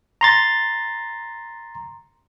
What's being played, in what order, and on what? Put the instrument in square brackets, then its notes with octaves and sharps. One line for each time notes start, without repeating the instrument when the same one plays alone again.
[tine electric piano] A#5 C6 A6